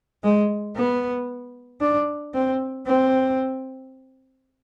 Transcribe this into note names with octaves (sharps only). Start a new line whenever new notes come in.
G#3
B3
D4
C4
C4